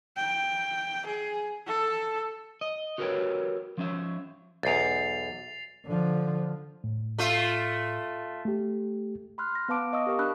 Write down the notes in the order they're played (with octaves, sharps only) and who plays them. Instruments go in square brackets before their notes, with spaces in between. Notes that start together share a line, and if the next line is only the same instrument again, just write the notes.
[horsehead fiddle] G5
G#4
A4
[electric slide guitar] D#5
F#4 G4 A#4 B4 C#5 G5
F3 C#4 E5
[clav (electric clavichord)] B1 E2 [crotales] A6 C7 F7
[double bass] D3 F3
[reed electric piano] A2
[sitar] A3 F4
[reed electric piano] A3 G4
[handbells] B5 C6 F6 F#6
A#6
B3 B4 F5 A5 D6 D7
D#5 F5 C#6 D#6 E6
G4 A#4 C#6
D4 B5 E6 F#6